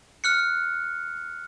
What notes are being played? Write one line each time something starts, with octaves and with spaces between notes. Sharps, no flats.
F6 F#6 C#7